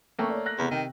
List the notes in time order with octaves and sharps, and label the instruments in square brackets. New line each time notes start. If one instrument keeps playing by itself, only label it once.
[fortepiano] A3 A#3 [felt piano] C#4 G5 C#6
[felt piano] C#5 D5
F#6 A#6
[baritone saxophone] E2 [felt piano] C3 B3 A#5
[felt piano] C3 G5 [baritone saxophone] D#3